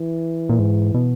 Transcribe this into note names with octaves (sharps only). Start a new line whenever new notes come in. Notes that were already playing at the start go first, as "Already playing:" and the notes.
Already playing: E3
A#2
G#2
B2